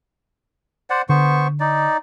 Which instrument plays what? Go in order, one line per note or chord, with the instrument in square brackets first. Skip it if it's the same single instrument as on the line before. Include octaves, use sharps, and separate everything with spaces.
[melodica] C5 D5 F#5
[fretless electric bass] D3 [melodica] B3 C5 C#6
[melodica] D#4 D5